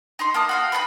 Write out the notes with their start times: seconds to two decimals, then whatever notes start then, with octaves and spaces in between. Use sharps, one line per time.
0.19 D#4 A#5 C6
0.34 A#3 A5 D#6
0.49 F#4 F5 G5
0.72 B4 F#5 A5 B5